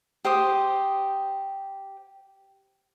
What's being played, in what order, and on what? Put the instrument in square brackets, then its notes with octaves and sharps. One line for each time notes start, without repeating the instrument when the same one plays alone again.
[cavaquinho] G4 C5 D6 D#6